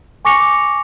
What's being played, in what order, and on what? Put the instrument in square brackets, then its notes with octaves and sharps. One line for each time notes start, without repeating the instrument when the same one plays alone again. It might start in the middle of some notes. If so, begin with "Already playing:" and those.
[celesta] G#5 C#6 D6 A#6 C#7 F7